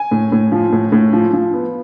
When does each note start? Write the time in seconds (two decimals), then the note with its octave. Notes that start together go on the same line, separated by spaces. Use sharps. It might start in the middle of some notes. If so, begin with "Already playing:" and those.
Already playing: G#5
0.11 A2
0.32 A2
0.52 F3
0.73 A2
0.92 A2
1.13 F3
1.33 F3
1.54 B3